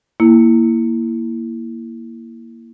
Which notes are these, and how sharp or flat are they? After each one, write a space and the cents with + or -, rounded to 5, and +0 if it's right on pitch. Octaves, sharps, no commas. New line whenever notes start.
A#3 +0 E4 +5